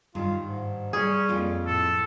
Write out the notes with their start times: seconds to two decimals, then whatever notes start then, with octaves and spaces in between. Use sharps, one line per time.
0.15 G2 D#3 F4
0.47 G#2
0.93 G3 C#4 G#4
1.29 F2 A#3 F4
1.66 A2 A4